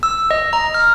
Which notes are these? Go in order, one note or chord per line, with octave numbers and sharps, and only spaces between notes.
E6
D#5
A#5
F6